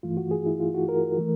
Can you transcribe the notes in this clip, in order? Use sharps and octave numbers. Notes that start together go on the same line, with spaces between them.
G2 E3 A3 F4
F#4
G#4
E4
F4
F#4
A#4
E3 A3